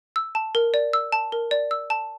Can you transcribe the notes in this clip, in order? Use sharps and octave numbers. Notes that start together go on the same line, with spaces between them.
E6
A5
A#4
D5
E6
A5
A#4
D5
E6
A5